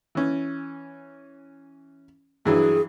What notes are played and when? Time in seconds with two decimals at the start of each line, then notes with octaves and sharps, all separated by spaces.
0.15 E3 C#4
2.46 G2 E3 F#3 G#4